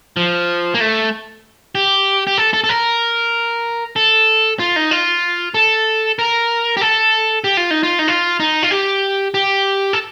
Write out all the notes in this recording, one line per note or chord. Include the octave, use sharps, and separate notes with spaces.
F3
A#3
A3
G4
G4
A4
A4
A4
A#4
A4
F4
D#4
F4
A4
A#4
G4
A4
G4
F4
D#4
F4
D#4
F4
D#4
F4
G4
G4
A4